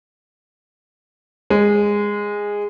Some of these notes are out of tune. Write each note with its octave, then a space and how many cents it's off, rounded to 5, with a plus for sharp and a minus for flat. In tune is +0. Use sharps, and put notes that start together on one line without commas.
G#3 -15